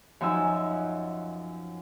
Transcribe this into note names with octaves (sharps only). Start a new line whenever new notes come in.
F#2 F3 D#4 G#5 E6